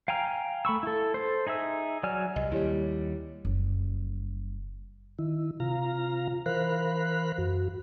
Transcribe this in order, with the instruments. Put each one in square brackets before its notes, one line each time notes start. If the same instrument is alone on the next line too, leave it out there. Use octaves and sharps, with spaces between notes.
[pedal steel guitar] F5 G5 G#5 A#5 F6
A3 B5 C#6 E6
E4 A4
A4 C5
D#4 G#4 E5 E6
F#3 D5 G#5 F6
[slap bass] C2 [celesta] D#5
[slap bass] D#2 G3 [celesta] E4 G4 C#5
[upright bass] F#1 G3
[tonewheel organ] D#3 E4
C3 F4 F5 A#5
E3 A#4 C5 F5 B5 F#6
F#2 F#4